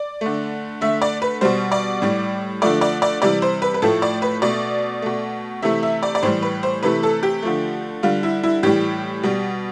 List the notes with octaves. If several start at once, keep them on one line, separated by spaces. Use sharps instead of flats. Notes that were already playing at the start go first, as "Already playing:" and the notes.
Already playing: D5
D3 A3
D3 A3 E5
D5
B4
B2 G3 C5
D5
A2 G3
D3 F3 A3 D5
D5
D5
C3 E3 G3 D5
C5
B4
B4
A2 F3 A3 A4
D5
B4
B2 A3 D5
B2 A3
C3 E3 A3 E5
E5
D5
D5
A2 E3 G3 C5
B4
C5
C3 E3 A3 B4
A4
G4
D3 F3 A3
D3 G3 F4
E4
E4
A2 E3 G3 G4
B2 G3